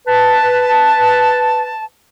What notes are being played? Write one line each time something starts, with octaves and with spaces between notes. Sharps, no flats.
B4 A5